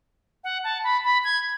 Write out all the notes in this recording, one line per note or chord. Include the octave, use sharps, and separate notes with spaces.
F#5
A5
B5
B5
G#6